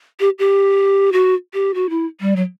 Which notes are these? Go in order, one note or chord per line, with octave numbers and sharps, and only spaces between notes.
G4
G4
F#4
G4
F#4
E4
G3
F#3